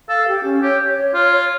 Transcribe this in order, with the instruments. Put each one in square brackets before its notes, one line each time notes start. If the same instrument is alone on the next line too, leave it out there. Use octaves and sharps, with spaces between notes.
[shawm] A4 [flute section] F5
[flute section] G4
C#4
[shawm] G4 [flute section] C#5
[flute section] C#5
C#5
[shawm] F4 [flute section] C#5
[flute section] C#5